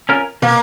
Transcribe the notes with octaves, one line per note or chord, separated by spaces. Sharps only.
C#4 F4 A#4
B2 A#3